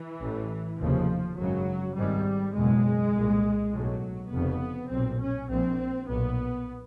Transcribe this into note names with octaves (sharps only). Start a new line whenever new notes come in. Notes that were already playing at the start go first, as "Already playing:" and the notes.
Already playing: E3
A1 A2
F1 D#2 C#3 F3
G#1 F#2 C#3 F#3
G#1 G#2 G3
F#1 E2 B2 G#3
C2 A#2
B1 A2 F#3
F1 F2 C#3 B3
B1 A#2 C4
C#4
A#1 A#2 C4
B1 A#2 B3